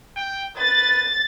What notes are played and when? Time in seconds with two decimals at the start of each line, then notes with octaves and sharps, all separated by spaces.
0.17 G5
0.57 B4 A6